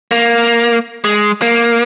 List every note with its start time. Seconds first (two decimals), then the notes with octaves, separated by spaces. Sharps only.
0.11 A#3
1.04 G#3
1.42 A#3